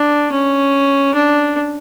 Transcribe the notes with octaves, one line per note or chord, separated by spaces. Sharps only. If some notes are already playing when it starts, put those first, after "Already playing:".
Already playing: D4
C#4
D4